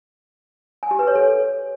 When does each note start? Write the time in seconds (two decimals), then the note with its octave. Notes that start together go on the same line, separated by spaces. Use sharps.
0.83 G#5
0.91 G4
0.99 B4
1.07 C#5
1.15 A4